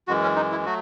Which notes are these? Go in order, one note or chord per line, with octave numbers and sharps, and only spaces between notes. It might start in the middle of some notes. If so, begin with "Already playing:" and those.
F#2 E3 G#3 F#4
C#4
D#4
E4
F#3 A3 F#4